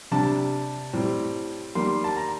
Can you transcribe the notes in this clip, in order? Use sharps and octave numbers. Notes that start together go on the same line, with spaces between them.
C3 G3 D4 A5
A2 G3 C4
D#3 G3 A#3 C6
A5
A#5